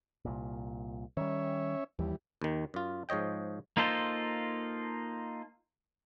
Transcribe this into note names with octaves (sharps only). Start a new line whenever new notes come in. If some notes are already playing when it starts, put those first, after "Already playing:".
C2 A#2
D#3 G3 C#4 C#5 E5
D#2 E3 G3
D#2 D#3
F#2 F4
G#2 F3 C#5 D#5 G5
A#3 D#4 F4 A4 C5